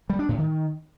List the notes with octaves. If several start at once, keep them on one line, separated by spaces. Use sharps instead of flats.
G3
D4
A2
D#3